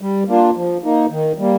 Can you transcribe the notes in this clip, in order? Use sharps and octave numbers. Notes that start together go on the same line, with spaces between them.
G3
A#3 D4 F4
F3
A#3 D#4
D#3
G3 A#3